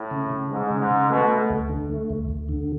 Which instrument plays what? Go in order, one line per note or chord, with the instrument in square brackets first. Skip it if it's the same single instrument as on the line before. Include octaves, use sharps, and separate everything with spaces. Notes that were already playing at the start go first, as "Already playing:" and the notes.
Already playing: [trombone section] A2
[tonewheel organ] C#3
C#3
[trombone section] G#2 [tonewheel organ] G#3
[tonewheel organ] C#3
[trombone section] G#2
[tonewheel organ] C#3
[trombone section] B2 [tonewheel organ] A3
[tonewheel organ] A3
D2
D3
A3
D2
D2
D3